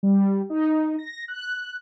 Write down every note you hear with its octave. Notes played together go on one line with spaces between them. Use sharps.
G3
D#4
A#6
F#6